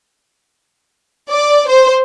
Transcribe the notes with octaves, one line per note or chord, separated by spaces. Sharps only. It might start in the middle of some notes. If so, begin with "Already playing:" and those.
D5
C5